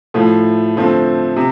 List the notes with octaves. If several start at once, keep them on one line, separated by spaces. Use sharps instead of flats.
A2 F3 A3
D3 F3 A3 C4
C3